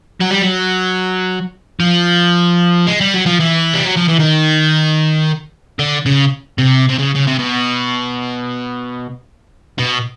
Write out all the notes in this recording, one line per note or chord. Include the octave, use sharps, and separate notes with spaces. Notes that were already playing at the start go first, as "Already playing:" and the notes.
F#3
G3
F#3
F3
G#3
G3
F#3
F3
E3
G3
F#3
F3
E3
D#3
D3
C#3
C3
C3
C#3
C#3
C3
B2
B2